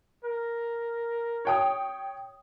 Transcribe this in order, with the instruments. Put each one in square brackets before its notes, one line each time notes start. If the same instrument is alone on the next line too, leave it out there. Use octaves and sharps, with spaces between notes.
[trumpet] A#4
[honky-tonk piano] C#5 G5 D#6